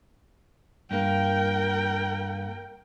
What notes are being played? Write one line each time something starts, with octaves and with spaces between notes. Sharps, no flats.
G2 A#3 A#4 G5